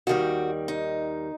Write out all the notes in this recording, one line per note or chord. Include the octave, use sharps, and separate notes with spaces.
D#2 D#3 G3 F#4
D#4